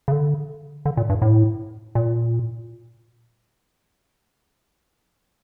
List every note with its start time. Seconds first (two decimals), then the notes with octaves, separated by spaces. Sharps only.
0.08 C#3
0.12 D3
0.85 D3
0.97 A#2
1.10 G2
1.22 A2
1.95 A#2